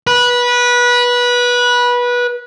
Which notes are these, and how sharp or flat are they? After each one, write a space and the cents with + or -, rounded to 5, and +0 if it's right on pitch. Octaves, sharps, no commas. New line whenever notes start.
B4 -20